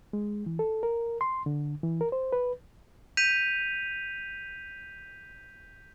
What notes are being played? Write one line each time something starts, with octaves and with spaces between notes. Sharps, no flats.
G#3
E3
A4
A#4
C6
D3
E3
A#4
C5
B4
G6 B6 D#7 F7